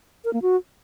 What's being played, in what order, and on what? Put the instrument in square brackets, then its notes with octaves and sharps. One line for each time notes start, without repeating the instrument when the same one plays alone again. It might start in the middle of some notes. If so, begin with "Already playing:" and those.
[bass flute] A#4
A#3
F#4